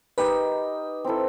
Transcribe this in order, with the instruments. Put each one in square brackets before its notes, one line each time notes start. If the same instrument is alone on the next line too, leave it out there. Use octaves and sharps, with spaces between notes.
[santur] D#4 G4 A#4 D#5 [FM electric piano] B4
[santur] C4 E4 A4